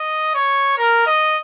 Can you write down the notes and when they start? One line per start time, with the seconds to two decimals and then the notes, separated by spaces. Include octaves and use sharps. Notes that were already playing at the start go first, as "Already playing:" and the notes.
Already playing: D#5
0.35 C#5
0.78 A#4
1.07 D#5